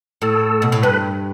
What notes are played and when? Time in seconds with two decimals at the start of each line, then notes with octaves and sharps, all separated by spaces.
0.22 A2 A4
0.62 B2
0.72 A2
0.83 G2 B4